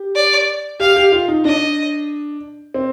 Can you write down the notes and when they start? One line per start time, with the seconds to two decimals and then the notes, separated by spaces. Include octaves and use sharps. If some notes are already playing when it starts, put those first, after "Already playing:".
Already playing: G4
0.15 D5
0.80 G4 F5
0.96 G4
1.12 F4
1.28 D#4
1.45 D4 D#5
2.74 C4